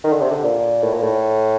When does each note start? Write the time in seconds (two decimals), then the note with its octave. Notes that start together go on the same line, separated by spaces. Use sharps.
0.04 D#3
0.12 D3
0.21 C3
0.31 D3
0.44 A#2
0.83 A2
0.93 A#2
1.03 A2